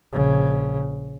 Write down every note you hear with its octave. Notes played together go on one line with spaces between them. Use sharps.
A#1 C#3